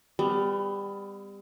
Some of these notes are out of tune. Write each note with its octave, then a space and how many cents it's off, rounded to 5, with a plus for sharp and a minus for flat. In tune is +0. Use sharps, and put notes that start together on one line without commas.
G3 +25 B3 +40